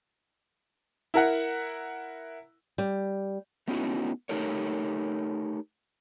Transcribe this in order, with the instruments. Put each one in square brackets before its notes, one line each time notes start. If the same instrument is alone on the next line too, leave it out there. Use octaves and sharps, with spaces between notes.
[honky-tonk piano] E4 A#4 F#5
[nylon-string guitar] G3
[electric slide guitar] A3 B3 C#4 D#4 E4 F#4
A3 D#4 G4 A4 A#4 C#5